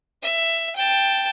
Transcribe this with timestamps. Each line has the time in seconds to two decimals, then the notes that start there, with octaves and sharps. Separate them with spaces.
0.22 E5
0.75 G5 A5